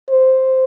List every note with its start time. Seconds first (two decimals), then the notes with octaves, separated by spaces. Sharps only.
0.10 C5